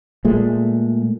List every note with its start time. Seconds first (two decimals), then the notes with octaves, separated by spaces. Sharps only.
0.25 A#2 G#3 A3